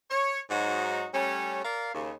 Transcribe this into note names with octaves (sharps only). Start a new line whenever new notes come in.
C#5
G#2 F#3 D#4 F#4
G3 A3 C#4
A#4 D5 F5
D#2 C#3